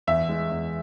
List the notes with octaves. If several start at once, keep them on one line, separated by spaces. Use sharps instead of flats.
E2 E5
G#3
E2